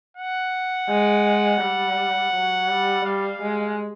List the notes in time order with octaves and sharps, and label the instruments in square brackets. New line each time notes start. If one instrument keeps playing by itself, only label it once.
[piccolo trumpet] F#5
[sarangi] G#3
G3
F#3
G3
[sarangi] G3 [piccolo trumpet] F5
[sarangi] G#3